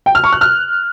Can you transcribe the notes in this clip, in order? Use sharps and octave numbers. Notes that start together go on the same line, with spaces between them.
G5
F6
C#6
F#6
F6